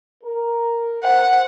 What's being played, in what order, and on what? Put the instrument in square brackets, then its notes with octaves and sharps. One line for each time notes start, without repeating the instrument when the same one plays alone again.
[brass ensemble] A#4
[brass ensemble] C5 [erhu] F#5